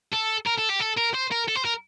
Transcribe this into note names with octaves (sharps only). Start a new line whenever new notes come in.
A4
A#4
A4
G4
A4
A#4
C5
A#4
A4
C5
A#4